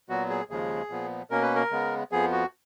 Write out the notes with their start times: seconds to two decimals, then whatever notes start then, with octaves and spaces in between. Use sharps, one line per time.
0.09 A#2 F#3 B3 F#4
0.30 G#4
0.50 D#2 C#3 F3 G#3 G#4
0.90 A#2 F3 B3
1.30 B2 A#3 C#4 A#4
1.42 B4
1.55 A#4
1.71 C#3 G#3 B3
2.12 F2 F3 B3 G#4
2.32 F#4